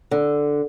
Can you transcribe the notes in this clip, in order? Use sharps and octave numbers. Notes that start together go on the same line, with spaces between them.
D3